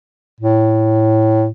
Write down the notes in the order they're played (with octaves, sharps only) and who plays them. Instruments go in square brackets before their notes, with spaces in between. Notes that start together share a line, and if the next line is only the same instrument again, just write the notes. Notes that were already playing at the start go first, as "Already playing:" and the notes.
[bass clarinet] A2